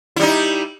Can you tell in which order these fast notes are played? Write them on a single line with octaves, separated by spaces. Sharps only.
E4 G3 D#4